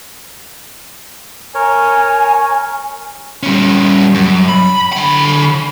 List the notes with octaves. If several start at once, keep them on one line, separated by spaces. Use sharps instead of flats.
A#4 C#5 G#5
G3 C#4
F#2
B5
D3 B5